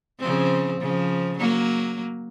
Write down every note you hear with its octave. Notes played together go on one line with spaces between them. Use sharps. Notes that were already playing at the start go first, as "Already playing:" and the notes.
C#3 F3 C4
C#3 F3
F#3 A#3